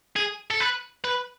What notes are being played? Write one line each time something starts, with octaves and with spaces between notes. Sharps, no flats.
G#4
A4
B4
B4